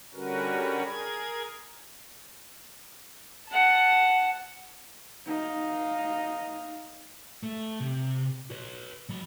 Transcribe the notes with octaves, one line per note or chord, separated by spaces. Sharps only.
D3 G3 C#4 F#4 A#4 B4
G#4 A#4 G#6
F#5 A5
D#4 F5
A3
C3
B4 C#5
F#3 B5